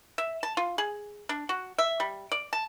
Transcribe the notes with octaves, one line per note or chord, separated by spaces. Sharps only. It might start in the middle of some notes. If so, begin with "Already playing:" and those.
E5
A5
F4
G#4
D4
F#4
E5
G3
D5
A5